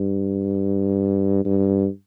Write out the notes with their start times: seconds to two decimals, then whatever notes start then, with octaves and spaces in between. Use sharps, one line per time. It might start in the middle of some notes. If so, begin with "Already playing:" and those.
Already playing: G2
1.45 G2